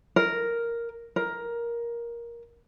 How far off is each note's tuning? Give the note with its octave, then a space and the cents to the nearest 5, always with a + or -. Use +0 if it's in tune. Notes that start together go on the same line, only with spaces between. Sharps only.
A#4 +0
A#4 +10